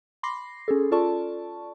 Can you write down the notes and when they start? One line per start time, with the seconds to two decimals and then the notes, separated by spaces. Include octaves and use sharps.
0.23 B5 C6 D6 A#6 C7
0.68 C#4 G#4 A4
0.91 F4 A4 D5 A5 C#6